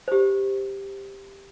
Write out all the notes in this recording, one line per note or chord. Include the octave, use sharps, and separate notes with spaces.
G4 C5